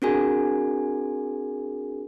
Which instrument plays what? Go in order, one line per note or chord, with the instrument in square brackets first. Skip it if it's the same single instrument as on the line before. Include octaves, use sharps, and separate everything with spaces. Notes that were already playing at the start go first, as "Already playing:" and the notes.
[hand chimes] C4 D4 F#4 G#4 A#4 G#5